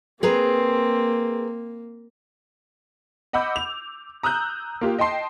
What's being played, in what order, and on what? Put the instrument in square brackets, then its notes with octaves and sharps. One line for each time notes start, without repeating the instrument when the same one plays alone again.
[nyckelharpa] A#3 [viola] C4 [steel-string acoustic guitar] G#4 B4 A#5
[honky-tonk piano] D#5 F#5 B5 D6 E6 G6
F7
A#5 D#6 E6 F#6 G6
A#3 F4 G4
D#5 G5 A5 C6 C7